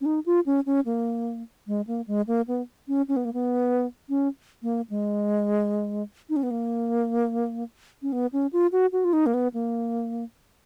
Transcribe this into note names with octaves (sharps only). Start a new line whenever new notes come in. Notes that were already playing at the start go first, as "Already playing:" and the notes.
C#4
D#4
F4
C#4
C#4
A#3
G#3
A#3
G#3
A#3
B3
C#4
C#4
B3
A#3
B3
C#4
A#3
G#3
D#4
C#4
B3
A#3
C#4
B3
C#4
F4
F#4
F#4
F4
D#4
A#3
B3
A#3